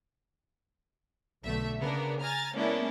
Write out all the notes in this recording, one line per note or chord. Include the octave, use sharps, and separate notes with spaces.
B1 D3 A3 E5
C#3 A#3 B3 D4 A#4
G#5 A#5 F6 A6
G#3 A#3 B3 C#4 D4 E4